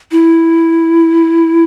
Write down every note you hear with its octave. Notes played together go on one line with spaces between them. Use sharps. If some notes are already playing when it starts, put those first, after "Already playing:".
E4